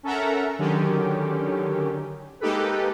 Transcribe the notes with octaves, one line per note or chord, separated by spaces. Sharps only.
C#4 A4 A#4 E5 F#5 A#5
D3 D#3 F#3 C#4 G4
G#3 A#3 D#4 G4 A4 B4